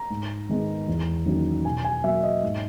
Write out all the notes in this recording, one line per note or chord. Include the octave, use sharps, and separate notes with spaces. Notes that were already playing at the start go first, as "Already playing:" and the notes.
Already playing: A#5
G#2
D#3 G#3 B3
E2
D#3 F#3 A#3 C#4
B2 G#5
G#5
F#3 A#3 E5
D#5
G#2